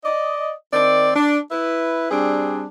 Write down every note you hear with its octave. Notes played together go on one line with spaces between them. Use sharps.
D5 D#5
D#3 C4 D5
D4
E4 B4
G3 C4 D4 G#4